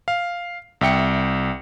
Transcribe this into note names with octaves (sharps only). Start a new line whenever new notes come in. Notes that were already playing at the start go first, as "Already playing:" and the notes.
F5
C2 E5 G5 C#7